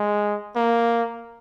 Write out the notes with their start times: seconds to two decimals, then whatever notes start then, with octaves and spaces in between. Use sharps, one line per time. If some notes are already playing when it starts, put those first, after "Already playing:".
Already playing: G#3
0.56 A#3